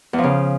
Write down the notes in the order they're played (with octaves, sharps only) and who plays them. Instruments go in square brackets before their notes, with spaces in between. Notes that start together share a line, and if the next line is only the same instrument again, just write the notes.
[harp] E2
F3
C#3